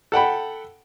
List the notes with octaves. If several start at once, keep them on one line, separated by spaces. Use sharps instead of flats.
A4 F#5 G5 B5